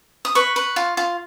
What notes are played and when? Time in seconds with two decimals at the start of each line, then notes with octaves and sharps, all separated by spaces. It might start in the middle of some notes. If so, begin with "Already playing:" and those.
0.25 D#6
0.35 B4 C#6
0.56 B4
0.76 F4
0.97 F4